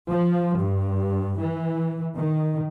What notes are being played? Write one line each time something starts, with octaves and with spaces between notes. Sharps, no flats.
F3
G2
E3
D#3